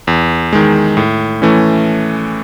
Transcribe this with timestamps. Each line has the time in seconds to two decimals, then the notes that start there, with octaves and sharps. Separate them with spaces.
0.07 E2
0.53 D#3 G#3
0.97 A2
1.42 E3 A3 C#4